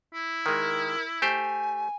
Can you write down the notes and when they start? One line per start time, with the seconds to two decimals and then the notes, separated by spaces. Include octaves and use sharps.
0.14 E4
0.46 D#3 G#3 A#4
1.22 A3 G4 C5 G#5